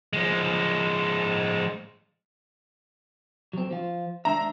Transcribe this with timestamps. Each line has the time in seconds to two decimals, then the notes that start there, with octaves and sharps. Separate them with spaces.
0.13 F3 G#3
3.53 F#3 C4
3.71 F3 F4
4.25 G#3 D4 E5 A#5